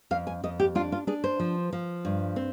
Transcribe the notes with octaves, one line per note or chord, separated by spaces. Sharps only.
F2 F5
G#5
F2 D#5
G4
D4 F4
F4
D4 G#4
C5
F3
F3
G2
C4